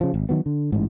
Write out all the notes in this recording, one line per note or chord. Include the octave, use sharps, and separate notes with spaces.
C#3 F3
G#1
D#3 F#3 B3
D3
A1 G#2